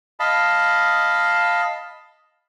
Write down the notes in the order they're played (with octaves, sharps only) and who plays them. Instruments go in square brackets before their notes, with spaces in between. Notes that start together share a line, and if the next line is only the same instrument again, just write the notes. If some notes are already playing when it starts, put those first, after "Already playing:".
[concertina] D#5 F5 A5 B5